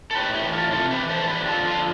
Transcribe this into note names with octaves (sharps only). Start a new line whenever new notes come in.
A4
A2 G4 B4
E4 G4
E3
F4 A4
C3 F4 A4
G4 B4
E3
A4 C5
A4
D3 G4 B4
F4 A4
F3
F4 A4